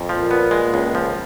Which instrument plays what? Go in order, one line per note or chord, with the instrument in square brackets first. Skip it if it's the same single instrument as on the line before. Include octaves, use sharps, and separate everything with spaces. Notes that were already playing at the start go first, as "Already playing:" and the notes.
Already playing: [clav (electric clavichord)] F2
[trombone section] A#2 [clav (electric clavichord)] F3
[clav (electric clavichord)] B3
G#3
C#2
F3